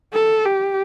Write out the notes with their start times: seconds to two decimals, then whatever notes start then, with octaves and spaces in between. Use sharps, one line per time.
0.13 A4
0.45 G4